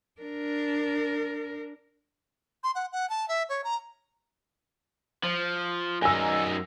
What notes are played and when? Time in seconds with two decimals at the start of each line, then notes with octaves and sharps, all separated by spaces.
0.21 D4 A#4
2.64 C6
2.75 F#5
2.92 F#5
3.10 A5
3.29 E5
3.49 C#5
3.64 A#5
5.24 F3
6.02 F#2 D#4 G#5 E6